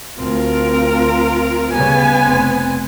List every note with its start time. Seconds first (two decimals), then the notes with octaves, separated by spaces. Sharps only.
0.19 D2 C4 F4 A#4
1.72 C#3 G3 B3 G#5
2.24 F1 C4